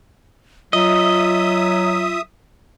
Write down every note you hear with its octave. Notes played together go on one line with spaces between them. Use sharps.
F#3 F4 D#5 E5 D#6